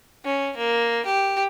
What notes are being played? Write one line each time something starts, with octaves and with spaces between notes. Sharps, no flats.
C#4
A#3
G4